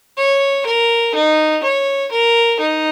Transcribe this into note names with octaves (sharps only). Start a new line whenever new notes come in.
C#5
A#4
D#4
C#5
A#4
D#4